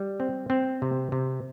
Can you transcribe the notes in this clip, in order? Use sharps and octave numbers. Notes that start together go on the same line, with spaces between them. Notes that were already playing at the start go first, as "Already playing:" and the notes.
Already playing: G3
C4
C4
C3
C3